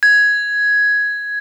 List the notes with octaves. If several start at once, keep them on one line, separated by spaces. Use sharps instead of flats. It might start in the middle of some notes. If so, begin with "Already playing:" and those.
G#6